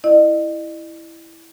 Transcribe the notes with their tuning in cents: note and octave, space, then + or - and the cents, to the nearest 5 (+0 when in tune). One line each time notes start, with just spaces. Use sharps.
E4 +0 D#5 -40